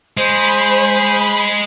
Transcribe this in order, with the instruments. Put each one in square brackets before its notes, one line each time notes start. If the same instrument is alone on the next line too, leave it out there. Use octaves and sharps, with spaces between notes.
[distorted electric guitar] G#3 [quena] C5 [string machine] B5